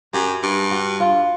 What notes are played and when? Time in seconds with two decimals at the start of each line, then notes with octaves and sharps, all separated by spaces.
0.14 F#2 G4
0.43 G2
0.71 F#4
1.00 F4